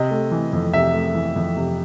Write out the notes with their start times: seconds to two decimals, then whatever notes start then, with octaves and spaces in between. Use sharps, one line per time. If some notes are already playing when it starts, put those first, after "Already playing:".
Already playing: C3 D#5
0.11 A3
0.32 E3
0.53 F2
0.73 C3 E5
0.94 A3
1.15 E3
1.36 F2
1.56 C3